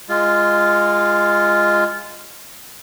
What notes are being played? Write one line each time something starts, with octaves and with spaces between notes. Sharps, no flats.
G#3 F4